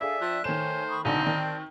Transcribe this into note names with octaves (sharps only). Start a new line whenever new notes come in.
D4 G#4 A4 E5 F5
F3 G5 F#6
D#3 A3 C5 C#5 G#5 E7
B5 C#6 D#6
B1 D3 C4 D#4 F#5 G#5 A5
D#3 D5 G5 A5